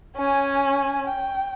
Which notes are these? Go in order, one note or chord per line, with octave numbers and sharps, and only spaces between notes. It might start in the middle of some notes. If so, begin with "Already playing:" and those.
C#4 G#5
G5